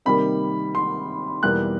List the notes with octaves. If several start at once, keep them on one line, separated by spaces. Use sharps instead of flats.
C3 D#3 G3 A#3 B5
C6
E2 B2 G3 A#3 F#6